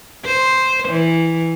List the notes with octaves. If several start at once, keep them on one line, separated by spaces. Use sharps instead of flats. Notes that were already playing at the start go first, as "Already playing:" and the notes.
C5
E3